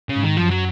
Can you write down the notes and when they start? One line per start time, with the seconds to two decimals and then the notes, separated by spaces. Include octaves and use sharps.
0.09 C#3
0.15 G#2
0.23 D#3
0.37 F#2 F3
0.50 F#3